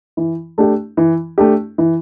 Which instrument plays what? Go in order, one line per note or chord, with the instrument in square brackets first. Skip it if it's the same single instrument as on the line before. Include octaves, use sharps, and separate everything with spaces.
[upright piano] E3
A3 D4 G4
E3
A3 D4 G4
E3